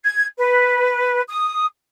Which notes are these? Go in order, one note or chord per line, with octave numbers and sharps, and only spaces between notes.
G#6
B4
D#6